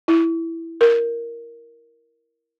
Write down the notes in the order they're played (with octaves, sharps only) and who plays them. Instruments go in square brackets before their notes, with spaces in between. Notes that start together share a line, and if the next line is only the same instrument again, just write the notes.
[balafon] E4
A#4